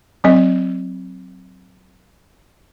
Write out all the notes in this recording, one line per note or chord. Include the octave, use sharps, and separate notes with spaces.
F#3 C4 D#5